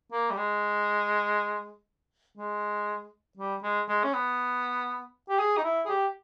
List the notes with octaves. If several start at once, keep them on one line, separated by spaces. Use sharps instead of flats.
A#3
G3
G#3
G#3
G3
G#3
G#3
C#4
B3
G4
G#4
D#4
E4
G#4
G4